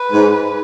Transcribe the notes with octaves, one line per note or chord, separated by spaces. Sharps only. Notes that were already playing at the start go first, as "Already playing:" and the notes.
Already playing: B4
G#2